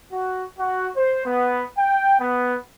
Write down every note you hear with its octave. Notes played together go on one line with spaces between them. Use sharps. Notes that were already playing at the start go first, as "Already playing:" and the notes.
F#4
F#4
C5
B3
G5
B3